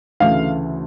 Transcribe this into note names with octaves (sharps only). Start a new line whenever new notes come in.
D2 C#3 E3 A3 F5